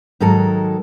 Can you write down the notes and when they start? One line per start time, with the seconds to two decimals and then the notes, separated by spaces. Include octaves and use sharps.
0.20 G#2 D#3 F#3 A4 A#4